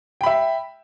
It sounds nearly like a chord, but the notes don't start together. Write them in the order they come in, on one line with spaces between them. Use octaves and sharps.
G5 B5 E5